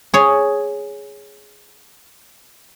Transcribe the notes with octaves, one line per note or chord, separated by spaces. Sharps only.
G#4 C#5